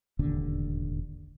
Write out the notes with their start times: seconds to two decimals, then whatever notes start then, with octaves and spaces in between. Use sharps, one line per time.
0.19 E1 A1 D#2 D3